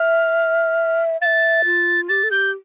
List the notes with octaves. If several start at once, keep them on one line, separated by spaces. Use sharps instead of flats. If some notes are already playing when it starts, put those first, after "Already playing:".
Already playing: E5 F6
E5 F5 A6
F4
G4 A6
A4
G4 G6